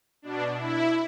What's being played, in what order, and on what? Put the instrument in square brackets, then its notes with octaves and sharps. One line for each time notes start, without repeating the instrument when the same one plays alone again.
[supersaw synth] B2 D4
E4